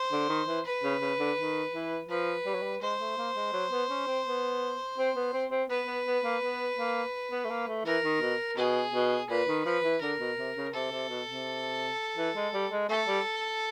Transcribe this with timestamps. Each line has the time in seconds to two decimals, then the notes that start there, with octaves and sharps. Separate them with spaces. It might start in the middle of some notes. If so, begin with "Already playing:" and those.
Already playing: C5
0.12 D3
0.29 D#3
0.47 E3
0.65 B4
0.83 C#3
1.01 C#3
1.19 D3
1.38 D#3
1.74 E3
2.09 F3 B4
2.46 G3
2.54 F#3
2.62 G3
2.81 G#3 C5
3.00 A3
3.18 A#3
3.36 G#3
3.53 F#3
3.71 B3
3.90 C#4
4.07 C4
4.26 B3
4.98 C4
5.16 B3
5.33 C4
5.51 C4
5.69 B3 B4
5.87 B3
6.06 B3
6.24 A#3
6.42 B3
6.78 A#3
7.31 B3
7.45 A3
7.50 A#3
7.68 A3
7.85 E3 A#4
8.04 D#3
8.22 B2
8.57 B2 G#4
8.93 B2
9.30 A#2 B4
9.48 D#3
9.65 F3 B4
9.84 E3
10.02 D3 A#4
10.20 B2
10.38 C3
10.56 C#3
10.74 C3 A4
10.92 C3
11.09 B2
11.28 C3
12.17 E3
12.36 G#3
12.54 G3
12.72 G#3
12.89 A3 A4
13.07 G3